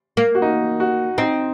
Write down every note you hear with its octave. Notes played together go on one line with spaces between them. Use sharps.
A#3
F#4
D#4
F#4
C4 D#4